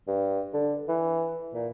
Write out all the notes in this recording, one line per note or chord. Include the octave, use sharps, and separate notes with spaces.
G2
D3
E3
A#2